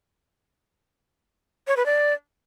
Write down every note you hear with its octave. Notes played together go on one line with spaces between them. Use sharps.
C#5
B4
D5